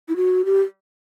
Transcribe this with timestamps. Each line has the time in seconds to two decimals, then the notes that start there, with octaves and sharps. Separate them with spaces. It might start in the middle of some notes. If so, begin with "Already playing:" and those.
0.09 E4
0.16 F#4
0.45 G4